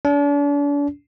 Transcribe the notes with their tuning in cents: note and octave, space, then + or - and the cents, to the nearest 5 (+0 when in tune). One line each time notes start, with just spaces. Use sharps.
D4 -40